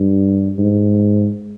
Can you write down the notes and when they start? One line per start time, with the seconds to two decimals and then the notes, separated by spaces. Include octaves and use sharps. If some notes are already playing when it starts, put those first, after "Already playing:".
Already playing: G2
0.59 G#2